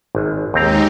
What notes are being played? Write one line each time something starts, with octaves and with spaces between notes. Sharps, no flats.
G#1
D#2 G#3 C4 D#4 G4 A#5